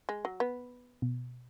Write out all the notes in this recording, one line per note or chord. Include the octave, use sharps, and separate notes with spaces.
G#3
F#3
B3
B2